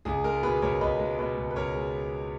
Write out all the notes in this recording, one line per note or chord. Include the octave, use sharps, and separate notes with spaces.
C#2 G#4
G#3 A#4
B2 G#4 B4
C#2 A#4 C#5
C#2 B4 D#5
G#3
B2 B4 D#5
C#2
B4
C#2 A#4 C#5
G#3